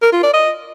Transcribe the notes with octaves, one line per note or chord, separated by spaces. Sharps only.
A#4
F4
D5
D#5